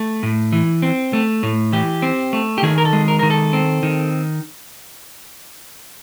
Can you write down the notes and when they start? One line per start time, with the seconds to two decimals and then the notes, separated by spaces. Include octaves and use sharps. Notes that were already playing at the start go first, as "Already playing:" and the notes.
Already playing: A3
0.23 A2
0.52 E3
0.82 C4
1.13 A3
1.43 A2
1.73 E3 G4
2.02 C4
2.33 A3
2.58 G4
2.63 D#3 G#4
2.78 A#4
2.85 A4
2.93 G#3
3.08 A#4
3.19 D#3 A#4
3.30 A4
3.53 C4
3.83 D#3